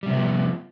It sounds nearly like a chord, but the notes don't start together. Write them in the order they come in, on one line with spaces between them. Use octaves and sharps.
G3 C3 C4 B3 F3